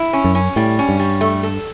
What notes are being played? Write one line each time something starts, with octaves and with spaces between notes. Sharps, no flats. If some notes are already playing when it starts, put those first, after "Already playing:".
Already playing: E4
C#4
F#2
C#4
A2 G3
C#4
G2
G3
A3
A4